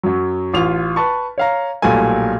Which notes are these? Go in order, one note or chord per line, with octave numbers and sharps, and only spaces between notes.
F#2 F#3
A1 F4 F7
B4 A5 C#6
C#5 F5 A#5
B1 A#2 G3 A3 G#5